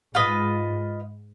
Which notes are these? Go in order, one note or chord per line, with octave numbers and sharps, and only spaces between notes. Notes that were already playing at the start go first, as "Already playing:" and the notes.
G#2 F4 B4 D#5